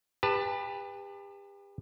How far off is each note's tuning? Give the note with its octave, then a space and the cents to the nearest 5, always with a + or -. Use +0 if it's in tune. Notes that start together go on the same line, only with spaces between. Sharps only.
G4 +35 B4 +0 A5 +10